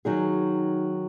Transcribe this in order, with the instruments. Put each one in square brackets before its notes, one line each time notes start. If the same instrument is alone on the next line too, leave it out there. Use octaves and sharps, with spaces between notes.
[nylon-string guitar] D#3 F#3 D#4 G#4